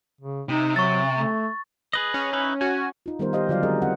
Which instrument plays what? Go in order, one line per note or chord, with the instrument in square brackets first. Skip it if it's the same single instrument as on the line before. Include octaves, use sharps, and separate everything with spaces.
[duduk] C#3
[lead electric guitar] C3 [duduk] D#4
[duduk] F#3 [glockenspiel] C#6 A6
[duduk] A3
[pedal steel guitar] G#4 B4 D#5
[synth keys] C#4
[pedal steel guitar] D#4 E4 B4
[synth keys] C#4 F#4 [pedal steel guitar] G#5
[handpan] D#4 F4
D#3 G3 B3 D#4 A#4 C5
G4 C5 D#5 F5
D3 F#3 F4 D5 F5
G3 G#3 C4 G#4 A#4 D#5
C4 F#5